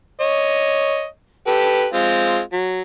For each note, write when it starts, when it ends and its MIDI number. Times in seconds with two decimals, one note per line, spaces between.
0.20 1.05 73
0.20 1.05 75
1.47 1.86 67
1.47 1.86 69
1.47 1.86 71
1.93 2.39 56
1.93 2.39 60
1.93 2.39 65
2.52 2.81 54